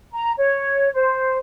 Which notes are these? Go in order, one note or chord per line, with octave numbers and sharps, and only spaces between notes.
A#5
C#5
C5